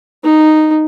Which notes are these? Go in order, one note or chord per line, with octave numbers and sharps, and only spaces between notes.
D#4